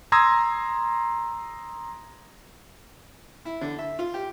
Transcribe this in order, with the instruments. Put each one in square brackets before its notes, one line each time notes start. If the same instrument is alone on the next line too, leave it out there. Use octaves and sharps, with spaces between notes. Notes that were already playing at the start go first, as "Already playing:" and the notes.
[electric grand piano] A#5 C6 D#6 E6 G#6 A#6
[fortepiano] E4
D3
E5
F4
G4